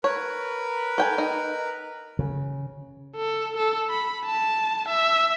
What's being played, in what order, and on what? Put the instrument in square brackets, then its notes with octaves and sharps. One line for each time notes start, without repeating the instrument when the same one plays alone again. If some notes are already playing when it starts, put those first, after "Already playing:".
[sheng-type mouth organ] A#4 B4 B5 [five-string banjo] C#5
[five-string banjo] A4 G5 G#5
D#4
[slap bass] C#3
[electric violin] A4
A4
B5
A5
E5